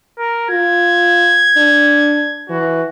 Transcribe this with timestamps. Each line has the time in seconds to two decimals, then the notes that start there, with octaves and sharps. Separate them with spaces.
0.19 A#4
0.50 F4 G#6
1.57 D4
2.50 E3 F#4